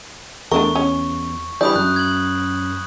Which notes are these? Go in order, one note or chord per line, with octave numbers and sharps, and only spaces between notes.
E2 A3 D4 A#4 C#6
C#4
E3 G3 D4 D5 B5 D#6 G6
F#2 F#6
G#6 F#7